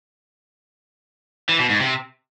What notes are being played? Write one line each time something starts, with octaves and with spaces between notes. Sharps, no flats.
E3
B2
G#2
C3